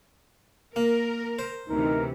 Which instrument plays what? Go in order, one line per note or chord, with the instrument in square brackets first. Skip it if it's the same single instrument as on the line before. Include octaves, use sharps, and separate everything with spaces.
[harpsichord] A#3 [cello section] A#4
[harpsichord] C5
[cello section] D2 C3 E3 [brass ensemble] D#4 A#4